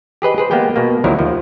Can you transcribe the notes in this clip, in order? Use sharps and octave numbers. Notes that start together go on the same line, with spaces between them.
G4 G#4 B4 D#5
G#4 B4 C5
G#3 A#3 B3 G4 G5
B2 A#3
D2 D#3 F3 F#3 E4 A#4
D#2 F3